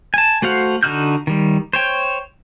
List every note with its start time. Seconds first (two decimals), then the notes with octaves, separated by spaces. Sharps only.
0.14 G#5 A5
0.42 A3 F#4 C5 F5 F#5
0.83 D3 D#4 F#4 F6 G6
1.27 D#3 G3
1.73 C5 C#5 G5